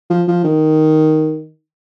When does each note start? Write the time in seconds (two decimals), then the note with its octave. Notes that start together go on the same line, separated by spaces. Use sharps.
0.10 F3
0.28 F3
0.44 D#3